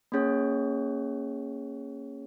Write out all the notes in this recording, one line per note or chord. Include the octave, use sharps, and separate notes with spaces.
A#3 C#4 G#4 C#5